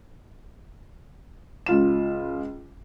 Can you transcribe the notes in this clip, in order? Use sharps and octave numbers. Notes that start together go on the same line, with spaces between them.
C#2 F4 E7